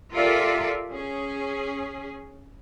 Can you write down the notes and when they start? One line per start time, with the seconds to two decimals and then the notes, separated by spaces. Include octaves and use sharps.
0.13 F4 G4 A4 A#4 D5 E5
0.90 C#4 G#4